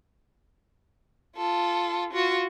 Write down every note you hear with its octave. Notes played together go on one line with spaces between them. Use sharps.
F4 A4
F4 F#4